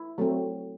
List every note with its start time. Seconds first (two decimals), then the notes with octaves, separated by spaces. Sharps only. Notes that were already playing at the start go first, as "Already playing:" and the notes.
Already playing: E4
0.18 F#3 A3 C4